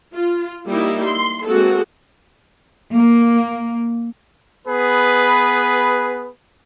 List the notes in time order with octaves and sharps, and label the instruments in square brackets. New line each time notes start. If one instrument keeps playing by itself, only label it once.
[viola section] F4
G3 A#3 D#4 E4 G4
C6
G#3 A#3 C4 F#4 G#4 A4
[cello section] A#3
[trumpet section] B3 G#4 B4